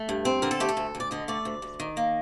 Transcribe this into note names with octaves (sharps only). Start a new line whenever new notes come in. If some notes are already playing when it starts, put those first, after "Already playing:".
Already playing: A3
G2
C4
D3 A#4
A4
A3 G4
A4
D2
D2
D5
D3 D#5
A3 D5
D2
D2
D#3
A#3